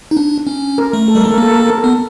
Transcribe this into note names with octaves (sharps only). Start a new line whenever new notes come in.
D#4
D4
C#4
A#4
A3
A4
G3 A#4
G#3 A4
A3
A#3 A#4
A4
A#4
A4
A#4
A4
B3